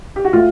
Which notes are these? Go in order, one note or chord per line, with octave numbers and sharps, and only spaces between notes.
G4
F#4
A2 F4